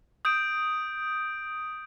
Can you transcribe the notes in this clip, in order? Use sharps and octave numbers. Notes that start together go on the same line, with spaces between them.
D#6 G6 D7